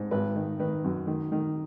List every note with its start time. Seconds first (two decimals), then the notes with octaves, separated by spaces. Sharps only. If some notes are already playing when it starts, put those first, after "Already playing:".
Already playing: G#2
0.11 G#1 B4
0.35 D#3
0.59 D#3 B4
0.84 F#2
1.07 D#3
1.32 D#3